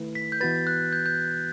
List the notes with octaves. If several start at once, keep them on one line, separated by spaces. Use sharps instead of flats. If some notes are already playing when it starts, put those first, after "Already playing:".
Already playing: D#3 A3 E4 B4
B6
G6
E3 B3 F#4 B4 A6
F#6
G6
G6